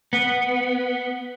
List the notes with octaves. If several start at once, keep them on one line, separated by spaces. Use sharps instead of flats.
B3